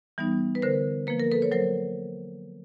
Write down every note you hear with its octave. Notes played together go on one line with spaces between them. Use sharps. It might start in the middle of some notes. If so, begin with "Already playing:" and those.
E3 G3 B3 D#4
B4
D3 A#4 C5
F3 A#3 B4
A#4
A4 B4
C#5
F#3 A#4 C5